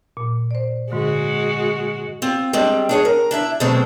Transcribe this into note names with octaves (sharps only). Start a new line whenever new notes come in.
A#2
C5 D5
G#2 D3 G#3 F#4
C4 F4
G3 G#3 C4 D4
D4 G#4 C#5
A#4
D4 E4 E5
B2 D3 F#3 G#3 A3 C4